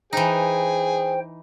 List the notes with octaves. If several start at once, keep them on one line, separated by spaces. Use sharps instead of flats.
E3 D#4 G#4 C5 G5